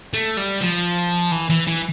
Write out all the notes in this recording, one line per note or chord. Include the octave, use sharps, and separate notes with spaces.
A3
G3
F3
E3
E3
E3